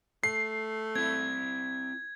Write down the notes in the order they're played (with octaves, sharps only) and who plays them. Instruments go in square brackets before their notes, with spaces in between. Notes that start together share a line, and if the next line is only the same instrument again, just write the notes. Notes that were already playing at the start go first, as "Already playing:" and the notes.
[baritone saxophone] A3 [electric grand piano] C7
[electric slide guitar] C4 E4 [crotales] G#6